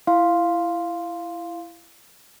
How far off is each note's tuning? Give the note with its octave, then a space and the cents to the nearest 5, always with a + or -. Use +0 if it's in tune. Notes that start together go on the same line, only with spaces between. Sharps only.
E4 +20 F5 +0 C6 +0